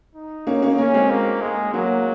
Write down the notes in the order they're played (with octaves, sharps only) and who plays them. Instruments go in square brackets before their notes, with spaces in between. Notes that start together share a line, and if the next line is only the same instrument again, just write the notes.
[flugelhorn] D#4
[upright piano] A#3 C#4
A#3 C#4
[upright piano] A#3 [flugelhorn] C#4
[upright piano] G#3 C4
[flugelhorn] A#3
G#3
[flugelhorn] F#3 [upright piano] A#3